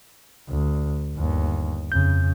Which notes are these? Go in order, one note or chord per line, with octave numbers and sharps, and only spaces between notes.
D2
G1 D#2
F2 C#3 G6